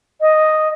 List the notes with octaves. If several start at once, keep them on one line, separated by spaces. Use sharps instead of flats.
D#5